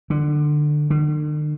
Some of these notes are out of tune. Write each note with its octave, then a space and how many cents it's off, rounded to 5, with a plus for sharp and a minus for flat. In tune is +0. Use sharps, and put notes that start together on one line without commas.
D3 +20
D3 +45